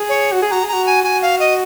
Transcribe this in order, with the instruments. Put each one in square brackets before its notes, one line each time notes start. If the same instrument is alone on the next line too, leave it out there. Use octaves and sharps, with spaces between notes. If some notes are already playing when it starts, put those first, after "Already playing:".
Already playing: [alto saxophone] G#4
[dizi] C#5
[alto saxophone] F#4
G#4
[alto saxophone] F#4 [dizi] A#5
[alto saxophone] G#4
[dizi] A#5
[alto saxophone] F#4
[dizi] G#5
[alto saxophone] F#4 [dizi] G#5
[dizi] F5
D#5